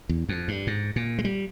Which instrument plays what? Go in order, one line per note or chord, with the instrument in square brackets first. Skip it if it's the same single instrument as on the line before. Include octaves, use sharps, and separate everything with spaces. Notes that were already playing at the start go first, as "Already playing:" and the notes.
[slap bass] E2
F2
G2
G#2
A#2
G#3
G3